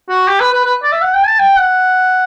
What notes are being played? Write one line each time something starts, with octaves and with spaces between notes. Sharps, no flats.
F#4
G4
B4
B4
B4
D5
E5
F#5
G5
A5
G5
F#5